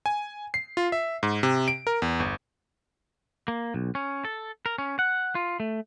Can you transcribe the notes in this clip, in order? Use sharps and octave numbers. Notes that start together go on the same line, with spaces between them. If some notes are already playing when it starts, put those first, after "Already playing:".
G#5
C7
F4
E5
G#2
C3
D7
A#4
E2
G1
A#3
B1
C#4
A4
A#4
C#4
F#5
F4
A3